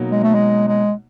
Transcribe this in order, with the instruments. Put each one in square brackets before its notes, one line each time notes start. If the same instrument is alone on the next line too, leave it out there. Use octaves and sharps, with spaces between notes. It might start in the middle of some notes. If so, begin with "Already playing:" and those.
Already playing: [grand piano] B2 F#3 A#3 D#4
[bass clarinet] G#3
A3
G#3
G#3